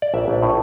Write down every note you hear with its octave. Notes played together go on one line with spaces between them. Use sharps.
D5
A#1 E5
A#1
A2